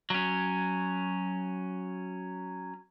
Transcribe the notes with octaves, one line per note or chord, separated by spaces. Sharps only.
F#3 C#4